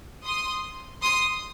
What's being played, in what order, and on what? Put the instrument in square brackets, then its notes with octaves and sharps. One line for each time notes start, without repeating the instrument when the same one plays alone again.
[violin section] C6 D#6
C6 D#6